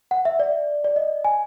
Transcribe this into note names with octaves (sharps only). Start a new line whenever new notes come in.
F#5
E5
D5
D5
D#5
G#5